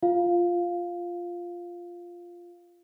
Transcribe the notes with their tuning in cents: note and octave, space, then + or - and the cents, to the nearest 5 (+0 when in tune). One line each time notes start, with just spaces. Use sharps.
F4 +0 F5 +0